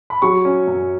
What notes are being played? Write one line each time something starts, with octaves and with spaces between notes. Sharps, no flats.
B5
F#3 C#6
C#4
F#2